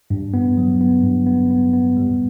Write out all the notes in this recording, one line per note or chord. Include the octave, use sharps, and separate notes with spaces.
G2
B3
F#3
B3
G2
B3
B3
B3
G3